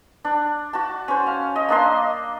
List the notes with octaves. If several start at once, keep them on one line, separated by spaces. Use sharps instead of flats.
D4
F#4 A5
C#4 C5
F5
D#5
A#3 D4 D#5 C6